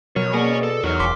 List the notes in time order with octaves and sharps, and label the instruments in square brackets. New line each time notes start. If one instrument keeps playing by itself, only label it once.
[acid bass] B2 [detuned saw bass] F#3 [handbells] A#4 [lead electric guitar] C#5
[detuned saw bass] A#3 [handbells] G#4 D5 [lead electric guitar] C#5 G#5
[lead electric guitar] A4
[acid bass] E2 [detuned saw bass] D#4 [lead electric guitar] F#4 C#5 [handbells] A#4 F6
[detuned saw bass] E1 [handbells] C6 D6 B6